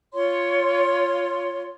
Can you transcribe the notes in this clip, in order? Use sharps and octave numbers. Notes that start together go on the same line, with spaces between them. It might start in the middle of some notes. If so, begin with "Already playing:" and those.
F4 C#5 C6